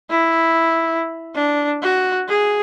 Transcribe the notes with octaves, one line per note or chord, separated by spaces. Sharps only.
E4
D4
F#4
G#4